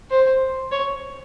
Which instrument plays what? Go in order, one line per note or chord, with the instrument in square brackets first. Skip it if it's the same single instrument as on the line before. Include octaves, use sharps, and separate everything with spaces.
[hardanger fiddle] C5
C#5